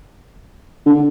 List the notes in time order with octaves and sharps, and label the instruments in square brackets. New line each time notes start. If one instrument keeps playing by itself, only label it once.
[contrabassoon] D3